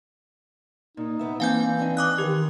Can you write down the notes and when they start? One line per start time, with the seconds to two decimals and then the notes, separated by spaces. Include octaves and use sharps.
0.97 A#2 D#4
1.19 E2 B3 E5
1.40 E3 A#3 C4 D4 F5 G#5 G6
1.79 C4 D4 D#4
1.97 D6 D#6 F#6
2.18 D#3 G4